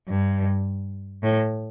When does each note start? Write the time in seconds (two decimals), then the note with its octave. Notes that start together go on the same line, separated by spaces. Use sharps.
0.08 G2
1.23 A2